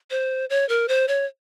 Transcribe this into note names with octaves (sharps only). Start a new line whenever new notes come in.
C5
C#5
A#4
C5
C#5